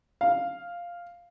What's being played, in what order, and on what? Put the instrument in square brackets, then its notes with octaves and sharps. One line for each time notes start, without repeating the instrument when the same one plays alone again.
[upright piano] F5